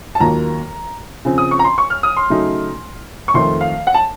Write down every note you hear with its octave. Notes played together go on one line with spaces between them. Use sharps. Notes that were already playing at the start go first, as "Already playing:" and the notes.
A5
D#2 D#3 F#3 A#3 F4 A#5
C#3 F3 C4
D#6
C#6
A#5
C6
C#6
F6
D#6
C6
C#3 F#3 A3 D#4
C#6
F2 D#3 A3 C6
F5
F#5
A5